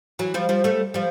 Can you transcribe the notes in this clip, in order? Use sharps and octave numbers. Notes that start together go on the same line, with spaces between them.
E3 F#3
F3 G3
F3 G3
G3 A3
F3 G3